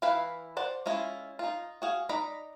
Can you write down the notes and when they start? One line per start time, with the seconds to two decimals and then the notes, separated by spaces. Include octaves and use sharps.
0.02 E3 E4 B4 F5 B5
0.57 C5 D5 F#5
0.86 G#3 C#4 E4 F4
1.39 D#4 F4
1.82 F#4 G#4 F5
2.09 D#4 D5 D#5 A#5 B5